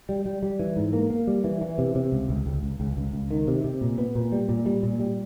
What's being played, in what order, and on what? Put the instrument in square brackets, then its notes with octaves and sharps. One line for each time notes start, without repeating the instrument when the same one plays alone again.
[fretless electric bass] G3
G3
G3
E3
G#2
A#3
A#3
G3
E3
E3
C3
C3
C#2
C#2
C#2
C#2
C#2
C#2
C#2
D#3
C3
C3
A#2
B3
A#2
G3
A#2
G3
A#2
G3